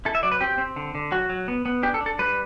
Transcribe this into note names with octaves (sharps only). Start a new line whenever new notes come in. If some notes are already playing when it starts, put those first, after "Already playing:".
E4 A4
E5
F#3 D5
B4
C4 G4
C4
D3
D3
F#3 F#4
F#3
B3
B3
D4 G4
A4
D4
A4
G3 B4